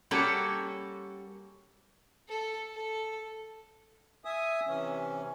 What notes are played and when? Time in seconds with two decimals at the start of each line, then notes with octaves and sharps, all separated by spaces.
0.11 G3 A#3 C#4 F#4 A4
2.29 A4
2.74 A4
4.25 E5 G#5 D#6
4.67 C3 E3 C#4